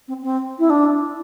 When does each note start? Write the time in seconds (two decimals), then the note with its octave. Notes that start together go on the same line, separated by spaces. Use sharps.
0.08 C4
0.23 C4
0.59 E4
0.70 D4